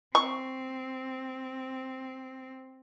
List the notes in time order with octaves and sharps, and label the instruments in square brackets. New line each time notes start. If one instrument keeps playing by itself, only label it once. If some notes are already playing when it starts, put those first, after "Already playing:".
[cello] C4 [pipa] C#6